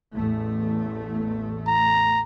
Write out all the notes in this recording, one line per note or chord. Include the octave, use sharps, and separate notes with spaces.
A1 E2 A3
A#5